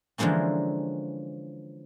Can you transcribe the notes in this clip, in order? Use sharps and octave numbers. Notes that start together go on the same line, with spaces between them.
D3 E3 F3 G#3 A#3 C#4